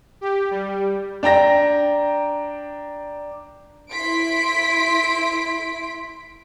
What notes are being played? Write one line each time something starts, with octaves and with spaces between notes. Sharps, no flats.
G4
G3
D4 G5 A#5 A#6
E4 C6 B6 D7